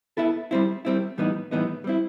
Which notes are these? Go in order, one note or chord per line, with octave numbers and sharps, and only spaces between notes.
B3 E4 A4 E5
G3 C4 E4
G3 C4 E4
A2 E3 G3 B3 D#4
A2 E3 G3 B3 D#4
G3 C4 E4